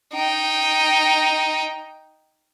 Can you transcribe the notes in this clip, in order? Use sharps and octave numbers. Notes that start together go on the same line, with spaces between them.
D#4 G5